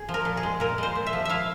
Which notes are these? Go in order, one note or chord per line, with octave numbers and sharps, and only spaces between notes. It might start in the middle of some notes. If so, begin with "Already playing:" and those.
Already playing: G#4
F3
A#4
A#2
G#4
G#3
A#2 A#4
G#3 C5
A#2
E5
F3
E4 E5 F5